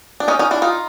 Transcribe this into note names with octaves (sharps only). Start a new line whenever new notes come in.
D4
C#4 D#4
C#4 D#4
D4 E4
D#4 F4